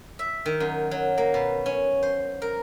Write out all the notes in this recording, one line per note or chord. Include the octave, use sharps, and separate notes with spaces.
E5
D#3
F#2
F#3
A#3
B2
C#4
C5
A#4